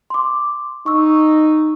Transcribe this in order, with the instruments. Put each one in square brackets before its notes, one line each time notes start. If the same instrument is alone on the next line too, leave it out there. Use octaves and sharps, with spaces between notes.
[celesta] C6 D6
[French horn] D#4 [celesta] C#6 E6